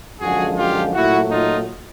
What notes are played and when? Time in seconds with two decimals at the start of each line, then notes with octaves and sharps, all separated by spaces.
0.21 F#2 D3 F3 G#3 F#4 G#4
0.58 F4 G4
0.94 A#2 F#3 A3 E4 F#4
1.31 D#4 F4